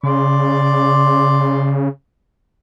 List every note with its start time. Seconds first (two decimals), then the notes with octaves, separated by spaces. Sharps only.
0.03 C#3 D5 C6 D6